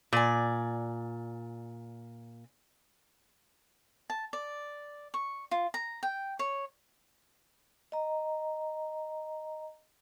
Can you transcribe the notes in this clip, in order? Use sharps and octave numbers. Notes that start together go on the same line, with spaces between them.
A#2 D5 G#5
A5
D5
C#6
F4
A#5
G5
C#5
D#5 A#5